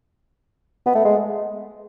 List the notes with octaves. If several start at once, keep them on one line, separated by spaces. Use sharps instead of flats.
B3
A3
G#3